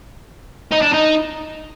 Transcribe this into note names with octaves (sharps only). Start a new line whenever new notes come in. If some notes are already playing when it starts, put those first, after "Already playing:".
D#4
D4
D#4